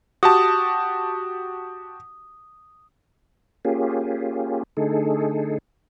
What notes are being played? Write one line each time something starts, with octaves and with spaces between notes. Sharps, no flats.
F#4 G4 A5 D#6
A#3 C#4 F4 G4 G#4
D3 A3 D#4 G#4 A4